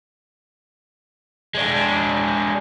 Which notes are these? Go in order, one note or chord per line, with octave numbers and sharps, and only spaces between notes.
G#3 D4